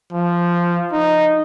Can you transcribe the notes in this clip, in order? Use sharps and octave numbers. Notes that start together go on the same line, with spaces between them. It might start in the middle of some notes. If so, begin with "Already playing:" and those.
F3
D#4